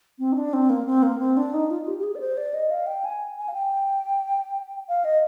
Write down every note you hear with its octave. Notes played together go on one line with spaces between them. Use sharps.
C4
D#4
D4
C4
A#3
C4
A#3
C4
D4
D#4
F4
G4
G4
G#4
D5
C5
D5
D#5
F5
G5
G#5
G#5
F5
G5
F5
D#5